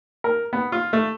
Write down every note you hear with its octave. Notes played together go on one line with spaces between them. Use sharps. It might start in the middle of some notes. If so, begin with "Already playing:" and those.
A#4
B3
F4
A3